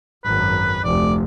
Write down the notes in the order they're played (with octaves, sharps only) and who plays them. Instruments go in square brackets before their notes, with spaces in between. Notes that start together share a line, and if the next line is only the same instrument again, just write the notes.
[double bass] G#1 F#2 [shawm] B4
[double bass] F1 D2 [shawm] D5